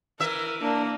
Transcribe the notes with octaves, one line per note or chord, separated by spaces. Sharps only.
E3 A#4 E5
A#3 D4